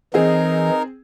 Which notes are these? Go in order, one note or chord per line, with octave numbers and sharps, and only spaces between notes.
E3 C4 D#4 G#4 A#4 D#5